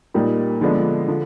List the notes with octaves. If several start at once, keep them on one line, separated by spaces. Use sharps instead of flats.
A#2 G3 A#3 D#4
D3 F3 G#3 B3 D4
D3 F3